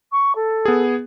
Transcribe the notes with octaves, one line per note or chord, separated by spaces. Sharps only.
C#6
A4
B3 G#4